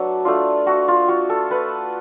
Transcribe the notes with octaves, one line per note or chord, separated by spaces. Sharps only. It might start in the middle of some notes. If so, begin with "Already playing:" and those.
Already playing: F#3 A3 D4 A4 B4
A3 D4 F4
A3 F#4
F4
F4 F#4
A4
A3 B4